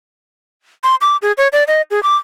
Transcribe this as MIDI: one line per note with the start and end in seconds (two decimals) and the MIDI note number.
0.83 0.95 84
1.01 1.17 86
1.22 1.32 68
1.38 1.48 73
1.53 1.64 74
1.67 1.82 75
1.91 2.02 68
2.03 2.16 86